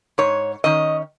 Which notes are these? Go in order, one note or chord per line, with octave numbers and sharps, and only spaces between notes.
G#2 C#5
D#3 C#4 D#5